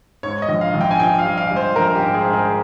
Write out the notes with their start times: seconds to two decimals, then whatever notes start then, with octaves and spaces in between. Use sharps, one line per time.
0.23 G#2 C#5
0.42 D#5
0.49 A#1
0.61 F5
0.74 A#1
0.81 G5
0.91 G#5
0.99 A#1 G5
1.19 F5
1.25 G3
1.38 F5
1.51 G3
1.56 C5
1.76 A#1 A#4
1.95 G4
2.01 G#2
2.14 G#4
2.26 G#2
2.33 G#4